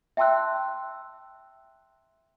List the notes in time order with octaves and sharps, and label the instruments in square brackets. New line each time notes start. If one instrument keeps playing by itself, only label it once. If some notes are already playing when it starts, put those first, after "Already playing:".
[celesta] E5 G5 A5 C6 E6 F#6